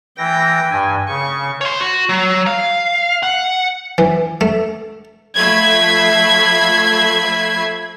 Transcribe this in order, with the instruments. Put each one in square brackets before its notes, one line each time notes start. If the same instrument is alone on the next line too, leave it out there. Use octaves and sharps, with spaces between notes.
[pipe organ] E3 A#6 [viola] G5
[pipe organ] G2 G#5
[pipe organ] C#3 [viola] C#6
[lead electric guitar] C#5 C6
F#4
F#3
F5
F#5
[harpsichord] E3
A3
[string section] F3 A3 E5 B5 G#6 C7